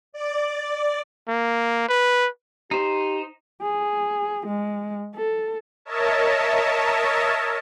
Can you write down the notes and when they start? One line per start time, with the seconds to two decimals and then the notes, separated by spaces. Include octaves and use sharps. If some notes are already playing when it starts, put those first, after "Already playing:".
0.13 D5
1.28 A#3
1.89 B4
2.71 D#4 G4 C5
3.62 G#4
4.47 G#3
5.16 A4
5.85 A#4 C#5 D#5 E5 A5